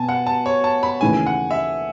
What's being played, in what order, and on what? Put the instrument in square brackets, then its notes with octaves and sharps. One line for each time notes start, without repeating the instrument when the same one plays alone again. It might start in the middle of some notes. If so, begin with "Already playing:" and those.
Already playing: [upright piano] B2 [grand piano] G#5 A5
[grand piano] F#5
A5
C#5
A5
B5
[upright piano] D#2 C#3 E3 A3 D#4 [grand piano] G#5
[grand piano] F#5
E5